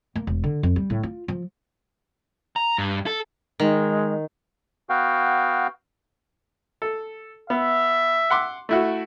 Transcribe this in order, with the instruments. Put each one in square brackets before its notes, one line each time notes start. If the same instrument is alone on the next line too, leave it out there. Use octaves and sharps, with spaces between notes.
[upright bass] A#3
E1
D3
F2
G3
A2
F4
F3
[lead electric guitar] A#5
G2
A4
[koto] D#3 [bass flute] G#3
[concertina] B3 F#4 F5 G5
[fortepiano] A4
[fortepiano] B3 [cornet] E5
[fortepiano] F#5 C6 D6
A3 E4 F#4